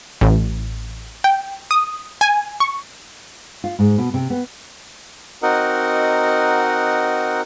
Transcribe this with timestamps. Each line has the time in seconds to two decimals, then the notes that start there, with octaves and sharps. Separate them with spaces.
0.21 A1
1.24 G5
1.71 D#6
2.21 G#5
2.60 C#6
3.64 F4
3.79 G#2
3.98 B2
4.14 C3
4.30 B3
5.43 C4 D#4 F#4 A#4 D#5 F#5